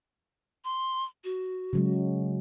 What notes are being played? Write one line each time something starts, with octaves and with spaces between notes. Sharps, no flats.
C6
F#4
C#3 F#3 G#3